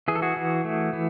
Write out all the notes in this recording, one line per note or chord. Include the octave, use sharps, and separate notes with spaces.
E3 G#4
A4
F#4 G#4
E3
A3
E3